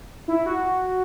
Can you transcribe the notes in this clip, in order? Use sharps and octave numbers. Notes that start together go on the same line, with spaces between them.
E4
F#4